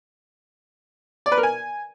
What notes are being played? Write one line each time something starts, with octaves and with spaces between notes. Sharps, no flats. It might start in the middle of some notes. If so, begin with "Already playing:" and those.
D5
B4
A#4
G#5